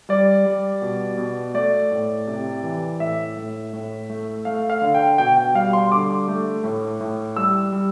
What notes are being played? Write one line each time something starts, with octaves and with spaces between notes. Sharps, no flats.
G3 D5
G3
B2
B2
A3 D5
A2
C3
E3
A2 E5
A2
A2
A3
A3 F5
F5
D3
G5
B2 G5
G5
G3 F5
C6
D3 D6
A3
A2
A2
G3 E6
G3